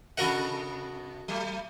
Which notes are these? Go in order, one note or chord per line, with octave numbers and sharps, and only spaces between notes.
C3 F#4 A4 A#4 D#5 F#5
F#3 A3